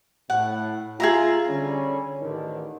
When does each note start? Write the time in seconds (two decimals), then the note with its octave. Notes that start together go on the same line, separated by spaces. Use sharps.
0.30 A2 F#5
1.00 F4 G#4 E5 A#5
1.47 D3 G3 C#4
2.21 A1 D3 D#3